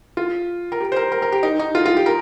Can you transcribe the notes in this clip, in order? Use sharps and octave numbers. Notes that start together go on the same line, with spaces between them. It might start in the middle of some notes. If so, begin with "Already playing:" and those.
F4
A#4
G4
C5
A#4
A#4
A#4
G4
D#4
D#4
F4
F4
G4
A#4